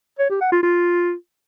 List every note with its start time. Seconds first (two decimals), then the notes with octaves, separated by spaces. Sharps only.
0.19 C#5
0.30 G4
0.41 F#5
0.52 F4
0.63 F4